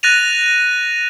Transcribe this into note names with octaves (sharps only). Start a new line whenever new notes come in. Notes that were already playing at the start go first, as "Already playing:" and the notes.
F#6 A6 A#6 D#7 F7